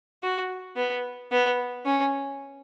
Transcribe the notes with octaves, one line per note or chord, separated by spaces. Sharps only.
F#4
B3
B3
C#4